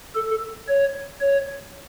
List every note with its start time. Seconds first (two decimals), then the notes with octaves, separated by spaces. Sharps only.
0.15 A4
0.68 C#5
1.21 C#5